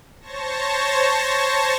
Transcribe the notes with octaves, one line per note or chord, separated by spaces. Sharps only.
C5 C#5 A5 C#6 A#6